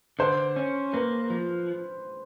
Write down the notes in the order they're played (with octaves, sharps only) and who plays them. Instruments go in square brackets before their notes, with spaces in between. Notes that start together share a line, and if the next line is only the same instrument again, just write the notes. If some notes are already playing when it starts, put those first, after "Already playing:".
[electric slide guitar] D3 [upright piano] C5
[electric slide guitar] C#4
[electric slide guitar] A#3 [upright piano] B4
[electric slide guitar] F3